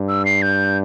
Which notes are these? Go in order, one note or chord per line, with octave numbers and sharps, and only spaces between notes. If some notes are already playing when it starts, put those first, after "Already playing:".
Already playing: G2
E6
C7
G6